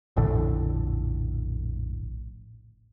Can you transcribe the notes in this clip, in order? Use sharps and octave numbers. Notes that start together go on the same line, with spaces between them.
F1 A#1 A2 D3